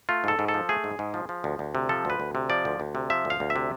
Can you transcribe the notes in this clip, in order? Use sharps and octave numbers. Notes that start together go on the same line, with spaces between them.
A3 F4
G#2 A4
G#2
A4
F3
A3 G#4
G#2
G#2
F3
F3
D2
D2
C3
F3 A4
D2 B4
D2
C3
F3 D5
D2
D2
C3
F3 E5
D2
F5
D2
E5
C3